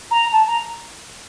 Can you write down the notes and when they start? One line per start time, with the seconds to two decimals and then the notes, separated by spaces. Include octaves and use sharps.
0.11 A#5
0.32 A5
0.47 A#5